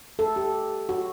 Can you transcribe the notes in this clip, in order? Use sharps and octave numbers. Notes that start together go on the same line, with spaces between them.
A4
G4
F#4